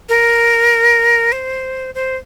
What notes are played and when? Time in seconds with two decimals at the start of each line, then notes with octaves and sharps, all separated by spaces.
0.09 A#4
1.32 C5
1.95 C5